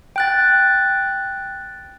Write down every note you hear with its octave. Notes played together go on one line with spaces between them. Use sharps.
G5 F#6 A6